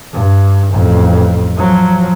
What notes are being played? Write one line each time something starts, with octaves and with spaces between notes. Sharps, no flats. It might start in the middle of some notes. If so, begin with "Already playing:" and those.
G2
A1 F2
F3 F#3